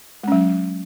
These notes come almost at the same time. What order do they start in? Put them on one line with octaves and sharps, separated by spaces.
G#3 C#4 F#3